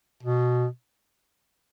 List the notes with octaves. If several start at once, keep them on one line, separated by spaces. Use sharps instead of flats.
B2